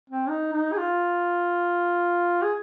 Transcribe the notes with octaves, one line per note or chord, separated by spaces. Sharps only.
C4
D#4
D#4
G#4
F4
G#4